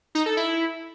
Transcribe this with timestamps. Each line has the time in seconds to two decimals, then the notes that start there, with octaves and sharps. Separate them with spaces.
0.15 D#4
0.26 A4
0.37 E4